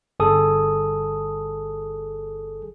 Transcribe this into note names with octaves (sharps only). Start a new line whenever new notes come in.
G1 G#4 A4 D#6